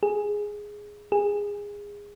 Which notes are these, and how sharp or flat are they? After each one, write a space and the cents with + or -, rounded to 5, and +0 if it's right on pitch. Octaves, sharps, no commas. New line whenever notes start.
G#4 +0
G#4 -20